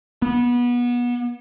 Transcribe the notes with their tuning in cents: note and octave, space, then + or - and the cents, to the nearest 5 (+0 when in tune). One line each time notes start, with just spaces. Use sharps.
B3 -25